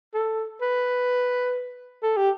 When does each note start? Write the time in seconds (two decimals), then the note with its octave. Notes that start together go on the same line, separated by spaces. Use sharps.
0.14 A4
0.61 B4
2.03 A4
2.17 G4